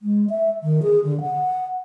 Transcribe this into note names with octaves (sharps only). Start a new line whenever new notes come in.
G#3
E5
D#3
G#4
D3
F#5